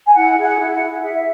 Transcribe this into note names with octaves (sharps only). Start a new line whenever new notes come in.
G#5
E4 F#5
G#4
F#5
E4
F#5
E4
G#4 E5